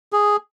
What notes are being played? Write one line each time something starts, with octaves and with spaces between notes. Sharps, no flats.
G#4